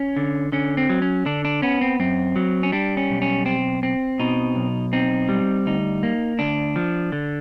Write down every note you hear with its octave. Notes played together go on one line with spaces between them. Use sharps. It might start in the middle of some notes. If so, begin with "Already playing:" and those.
Already playing: C#4
D3
D3 C#4
C4
F#3
C#4
D3 D4
D4
B3 C#4
C4
F#2 C4
F#3
C#4
G3 D4
C#4
B1
C#4
C4
C4
B2 D#4
B1
C4 D#4
G3
D2 D#4
A#3
D2 D4
F3
D3